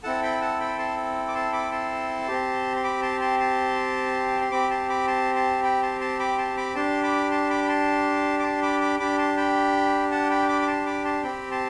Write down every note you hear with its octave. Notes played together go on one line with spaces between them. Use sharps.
C4 E4 A4 F#5 A5
G5 B5
F#5 A5
G5 B5
A5 C6
D6
A5 C6
B5 D6
A5 C6
C4 G4
C6
B5 D6
A5 C6
A5 C6
A5 C6
C6
C4 G4 B5 D6
A5 C6
B5 D6
A5 C6
A5 C6
G5 B5
A5 C6
A5 C6
B5 D6
A5 C6
B5 D6
D4 G4 A5 C6
B5 D6
A5 C6
B5 D6
B5
A5 C6
D6
A5 C6
B5 D6
B5 D6
D4 G4 B5 D6
A5 C6
G5 B5
F#5 A5
G5 B5
B5 D6
D6
A5 C6
B5 D6
A5 C6
C4 G4 G5 B5
A5 C6